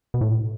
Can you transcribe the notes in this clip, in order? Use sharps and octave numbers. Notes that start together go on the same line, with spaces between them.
B2
A2